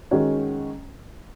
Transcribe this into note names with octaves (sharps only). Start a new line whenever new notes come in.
D#3 G#3 C#4 F#4